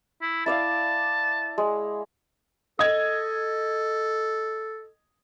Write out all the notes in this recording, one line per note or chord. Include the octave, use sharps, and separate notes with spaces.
E4
E4 D5 F5 A5
G#3
A4 D#5 G#6